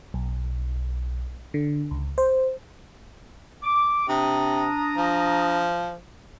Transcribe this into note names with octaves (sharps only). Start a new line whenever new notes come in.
B1
D3
C#2
C5
D6
C3 D4 A#5 D#6
F3